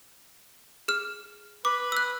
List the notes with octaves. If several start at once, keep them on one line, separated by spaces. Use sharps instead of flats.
G#4 F6
B4 B5 D6
E6 F#6